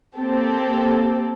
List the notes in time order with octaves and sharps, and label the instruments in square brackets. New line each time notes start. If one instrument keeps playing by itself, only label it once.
[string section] A#3 C4 G4 A4